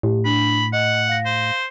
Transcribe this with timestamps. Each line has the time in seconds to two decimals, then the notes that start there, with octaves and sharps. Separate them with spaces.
0.03 A2 G4
0.25 D4 B5
0.73 D#5 F#5
1.08 F5 A#6
1.26 C5